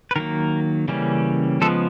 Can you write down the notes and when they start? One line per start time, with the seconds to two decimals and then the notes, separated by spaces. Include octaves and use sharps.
0.11 B4
0.16 D#3 F#3 A#3 A#4
0.88 C#3 E3 G3 A#3 C#4
1.61 C#3 F3 G#3 B3 A4